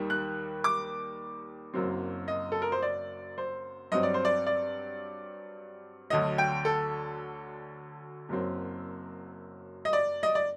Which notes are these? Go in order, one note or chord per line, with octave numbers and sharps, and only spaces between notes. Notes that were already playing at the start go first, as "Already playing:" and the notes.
Already playing: D#2 D#3 G3
F#6
D6
F#1 F#2 F#3 C4
D#5
A4
A#4
C5
D5
C5
G2 F#3 C4 D#5
D5
C5
D5
D5
D2 D3 F#3 D#5
G5
A4
F#1 F#2 F#3 C4
D#5
D5
D#5
D5